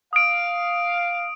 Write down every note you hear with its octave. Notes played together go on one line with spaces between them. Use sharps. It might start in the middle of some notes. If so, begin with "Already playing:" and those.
F5 D#6 D7